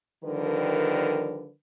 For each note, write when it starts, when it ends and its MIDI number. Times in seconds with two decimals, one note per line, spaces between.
0.24 1.49 50
0.24 1.49 51
0.24 1.49 53
0.24 1.49 55
0.24 1.49 70
0.24 1.49 71